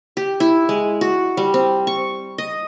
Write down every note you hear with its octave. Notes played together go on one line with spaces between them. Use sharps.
G4
E4
G#3
F#4
G3
C4
C#6
D#5